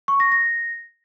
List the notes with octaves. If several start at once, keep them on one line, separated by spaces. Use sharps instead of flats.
C#6
A#6
A#6